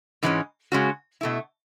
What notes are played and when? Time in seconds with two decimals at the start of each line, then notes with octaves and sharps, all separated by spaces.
0.23 G#2 E3 G#3 C#4
0.72 C#3 G#3 C#4 F#4
1.21 B2 A3 E4